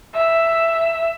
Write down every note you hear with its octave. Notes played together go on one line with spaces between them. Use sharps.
E5